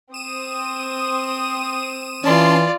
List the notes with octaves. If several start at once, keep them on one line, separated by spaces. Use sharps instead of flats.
C4 D#6 D#7 E7
E3 C#4 F4 D5 A5 C6